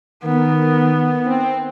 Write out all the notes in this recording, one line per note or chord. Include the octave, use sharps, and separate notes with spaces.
D#3 B3 A#4
C4